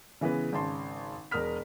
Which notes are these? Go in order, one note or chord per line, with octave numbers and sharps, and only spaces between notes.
C#3 E3 G#3 B3 B4
G#1 C#3 A5 C6
E1 A#4 D#6 F6 B6